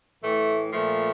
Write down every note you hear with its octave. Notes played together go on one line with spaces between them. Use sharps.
A2 E3 A3
A#2 F3 A3